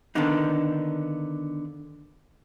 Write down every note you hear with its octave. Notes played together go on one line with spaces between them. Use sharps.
D3 D#3 A#3 B3 D4 D#4